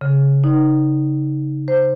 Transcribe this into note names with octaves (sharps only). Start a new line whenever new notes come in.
C#3
D#4
C5